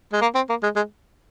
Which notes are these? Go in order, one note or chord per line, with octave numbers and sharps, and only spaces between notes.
G#3
A#3
C4
A#3
G#3
G#3